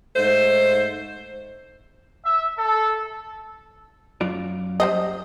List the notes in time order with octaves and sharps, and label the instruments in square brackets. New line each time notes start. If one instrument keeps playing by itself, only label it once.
[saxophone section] G#2 A3 C5
[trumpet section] E5
A4
[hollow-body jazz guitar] F#2 F4 D5
[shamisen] G3 C5 D#5